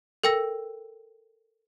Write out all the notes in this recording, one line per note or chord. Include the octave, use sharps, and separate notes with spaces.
A4 A#4 G5 E6 A#6